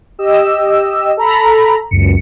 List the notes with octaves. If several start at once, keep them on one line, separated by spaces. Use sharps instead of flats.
G4 D#5 E6
A4 A#5 B5
C#2 F#2 C#7